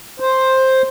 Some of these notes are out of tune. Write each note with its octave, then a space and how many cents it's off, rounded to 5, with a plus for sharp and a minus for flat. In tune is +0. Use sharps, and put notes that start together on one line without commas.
C5 +5